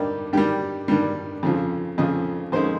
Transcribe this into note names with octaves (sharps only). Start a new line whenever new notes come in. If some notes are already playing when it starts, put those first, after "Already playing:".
Already playing: G2 G3 A#3 D#4 G4
G2 D#3 G3 G4
G2 D#3 G3
F2 C#3 F3
F2 C#3 F3 D#5
F2 D#3 G#3 C#4 C5